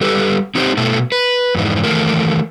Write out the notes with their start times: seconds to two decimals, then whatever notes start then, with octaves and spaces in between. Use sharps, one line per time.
0.01 G3 G4 A4 B4
0.55 C4 D#4 G4 C5
0.77 B2 A3 E4 A4
1.12 B4
1.55 F2 G#2 E3 D#4
1.83 D#3 E3 A3 A#4